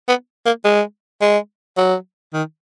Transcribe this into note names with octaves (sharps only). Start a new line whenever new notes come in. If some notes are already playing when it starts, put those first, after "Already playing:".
B3
A#3
G#3
G#3
F#3
D#3